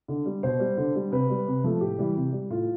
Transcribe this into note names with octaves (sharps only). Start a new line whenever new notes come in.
D3
G3
B2 C5
G3
D3
G3
C3 B4
G3
C3
F3 A3
A2 G4
E3 G3
C3
G3
A2 F4